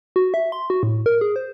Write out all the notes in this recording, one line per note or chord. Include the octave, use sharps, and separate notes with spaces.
F#4
E5
C6
F#4
A2
A#4
G#4
C5